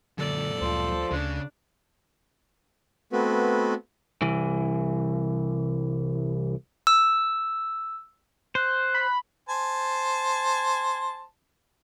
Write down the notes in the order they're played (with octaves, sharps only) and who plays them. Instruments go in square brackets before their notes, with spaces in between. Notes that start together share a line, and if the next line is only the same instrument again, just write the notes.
[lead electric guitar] F#2 A#2 [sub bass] D3 [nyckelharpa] A4 D5
[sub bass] D2 [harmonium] F3 C5
[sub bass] D2 [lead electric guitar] C#3 [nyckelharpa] D4
[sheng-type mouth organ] A3 B3 C4 F#4 B4
[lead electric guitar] C2 E3
[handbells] E6
[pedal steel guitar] C5 [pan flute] F#6
[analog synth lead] B5
[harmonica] C5 G#5 A5